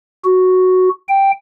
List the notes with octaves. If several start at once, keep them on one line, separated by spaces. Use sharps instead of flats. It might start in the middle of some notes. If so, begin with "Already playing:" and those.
F#4
G5